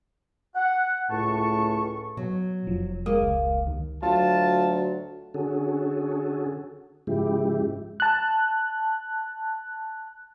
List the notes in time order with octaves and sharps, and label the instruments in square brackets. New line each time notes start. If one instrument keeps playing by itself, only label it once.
[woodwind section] F#5
[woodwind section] C#2 A5 C#6 [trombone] A2
[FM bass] B2 [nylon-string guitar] F#3
[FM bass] F1 [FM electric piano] F3
[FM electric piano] G#3 D#6 [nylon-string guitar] A#3
[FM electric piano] C#2
[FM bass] D#2
[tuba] D2 [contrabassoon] F#3 [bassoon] F4 [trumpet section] A5
[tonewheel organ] D3 C#4 F#4 G#4 A4
G#2 C#3 F3 G#3 E4 G4
[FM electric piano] A5 F#6